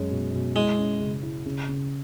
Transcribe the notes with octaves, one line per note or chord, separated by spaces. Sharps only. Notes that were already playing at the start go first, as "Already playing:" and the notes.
Already playing: F#2 G#3 C#4
B2
B2
G#3 E4
C#4
C#3
E4
C#3
C#3